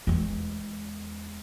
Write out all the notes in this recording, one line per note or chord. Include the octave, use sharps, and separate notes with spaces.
E2 G#3